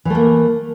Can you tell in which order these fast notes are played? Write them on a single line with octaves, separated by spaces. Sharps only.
E3 A3 A#3